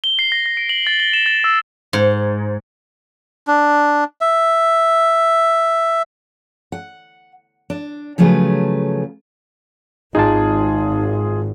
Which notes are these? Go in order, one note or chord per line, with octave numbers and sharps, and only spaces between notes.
G7
C7
A#6
A#6
D7
F#7
A6
G7
E7
A6
E6
G#2
D4
E5
F#5
D4
C#3 F3 F#3 A3 G#4 B4
G#1 D#4 F4 G#4 A5